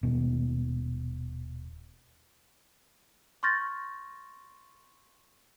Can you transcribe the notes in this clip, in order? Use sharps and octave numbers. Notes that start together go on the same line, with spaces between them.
D#1 B2
C6 C#6 F6 G6 A6 A#6